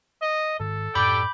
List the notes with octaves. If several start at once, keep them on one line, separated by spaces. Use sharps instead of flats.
D#5
G#2 D#3 A4
F#2 A2 D5 G5 B5 D6 G6